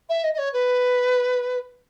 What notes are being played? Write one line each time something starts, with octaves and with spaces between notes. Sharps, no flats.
E5
D#5
D#5
C#5
B4